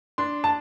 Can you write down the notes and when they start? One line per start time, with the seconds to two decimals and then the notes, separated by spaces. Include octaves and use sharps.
0.18 D4 C6
0.44 A5